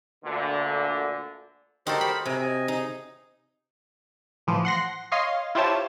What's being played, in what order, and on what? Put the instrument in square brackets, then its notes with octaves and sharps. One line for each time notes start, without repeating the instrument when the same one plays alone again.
[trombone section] D2 A#2 D3
[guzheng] D#4 F#4 A4 [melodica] G4 A#4 C5
[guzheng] B5
[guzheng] C3 [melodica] G5 G#5 A#5
[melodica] D#5 G#5
[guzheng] D#4 [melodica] G#4
[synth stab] A2 E3 F3
F#5 C6 A#6
C#5 D#5 F5 C6
E4 F4 G4 C5 C#5 A5